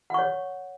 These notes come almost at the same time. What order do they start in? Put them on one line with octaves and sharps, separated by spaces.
F#5 C#6 C#5